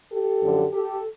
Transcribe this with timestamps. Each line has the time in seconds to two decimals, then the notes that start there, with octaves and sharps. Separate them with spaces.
0.11 G4 A4
0.42 F#2 D3 F3
0.73 G4 A4